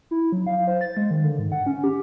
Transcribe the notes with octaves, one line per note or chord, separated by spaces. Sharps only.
E4
F#3
F5
C5
A6
G#3
D#3
D3
G#2
F#5
C#4
G4